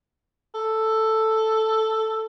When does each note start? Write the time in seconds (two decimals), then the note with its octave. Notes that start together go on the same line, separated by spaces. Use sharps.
0.54 A4